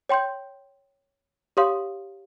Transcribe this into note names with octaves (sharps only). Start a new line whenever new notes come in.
C#5 G5 C6 G6
G4 C#5 F5 C6 D#6